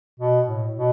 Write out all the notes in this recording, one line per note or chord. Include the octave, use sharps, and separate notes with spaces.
B2
A2
B2